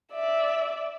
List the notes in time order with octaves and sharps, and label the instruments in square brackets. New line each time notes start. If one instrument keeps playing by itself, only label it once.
[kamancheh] D5 E5